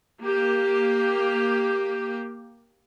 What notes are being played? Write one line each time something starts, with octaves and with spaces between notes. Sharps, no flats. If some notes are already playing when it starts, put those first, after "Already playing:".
A#3 G4